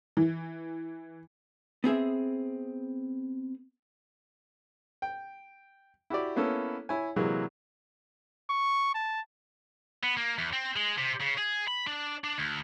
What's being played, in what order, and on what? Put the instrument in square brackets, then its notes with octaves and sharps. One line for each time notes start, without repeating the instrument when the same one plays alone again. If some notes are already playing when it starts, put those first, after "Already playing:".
[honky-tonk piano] E3
[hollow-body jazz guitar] B3 C4 G#4 E5
[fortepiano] G5
E4 F#4 G4 D5
A#3 B3 C#4 E4 A4
E4 C#5 G#5
C3 E3 F#3 G#3 A#3
[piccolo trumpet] C#6
A5
[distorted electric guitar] B3
A#3
E2
C4
G#3
C3
C#3
G#4
B5
D4
D4
D2